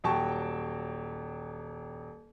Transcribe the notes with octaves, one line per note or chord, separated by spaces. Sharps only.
D#1 F#3 G4 G5 A5 C#6